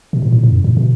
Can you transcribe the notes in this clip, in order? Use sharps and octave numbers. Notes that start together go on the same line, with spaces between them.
B2
A2
A2
A2
F#2
A2
B2